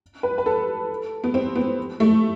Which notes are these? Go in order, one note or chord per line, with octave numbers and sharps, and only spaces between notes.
B4
B4
A4
B3
C4
B3
A3